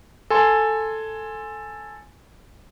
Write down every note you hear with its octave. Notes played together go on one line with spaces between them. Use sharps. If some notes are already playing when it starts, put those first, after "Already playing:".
A4 G#5 C6